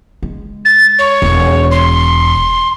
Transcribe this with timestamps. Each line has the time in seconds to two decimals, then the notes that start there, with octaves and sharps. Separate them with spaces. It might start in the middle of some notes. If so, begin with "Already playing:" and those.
0.23 G#3
0.65 A6
0.98 C#5
1.22 E1
1.71 C6